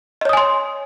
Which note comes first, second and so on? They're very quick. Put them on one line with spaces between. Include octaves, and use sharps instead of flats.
D#5 C#5 D#6 G#5 C6